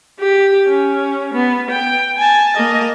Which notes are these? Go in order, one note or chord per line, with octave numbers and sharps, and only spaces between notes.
G4
C#4
B3
G5
G#5 A5
A#3 D#5